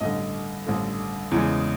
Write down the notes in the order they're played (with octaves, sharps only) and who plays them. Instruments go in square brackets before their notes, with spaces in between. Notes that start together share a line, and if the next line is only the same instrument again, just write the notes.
[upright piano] A1 G2 D3 D#5
A1 G2 D3
E2 C#3 E3 G#3